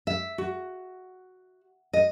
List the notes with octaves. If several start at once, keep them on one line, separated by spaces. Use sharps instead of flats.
E5
F#4
D#5